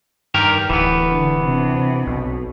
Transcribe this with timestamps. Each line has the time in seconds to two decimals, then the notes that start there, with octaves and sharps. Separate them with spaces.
0.34 G2 D#3 G4 A#4
0.69 D1 E3 B3
1.10 D3
1.41 C3 D4
2.07 B1 B2